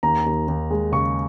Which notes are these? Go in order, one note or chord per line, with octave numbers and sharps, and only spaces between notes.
D#2 A#5
D#2
D#2
G#3
C#3 C#6